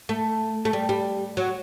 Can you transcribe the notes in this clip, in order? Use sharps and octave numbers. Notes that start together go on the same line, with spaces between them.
A3
A3
G3
G3
F#3